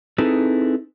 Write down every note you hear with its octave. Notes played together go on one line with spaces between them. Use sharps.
C4 D#4 E4 G#4 A4 B4